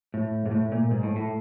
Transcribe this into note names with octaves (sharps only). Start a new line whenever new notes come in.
A2
G#2
A2
A#2
G#2
A2
A2